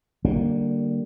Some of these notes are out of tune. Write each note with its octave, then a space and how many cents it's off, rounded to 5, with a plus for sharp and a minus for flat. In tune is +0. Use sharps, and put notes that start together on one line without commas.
D3 +0 G3 -30 A#3 +0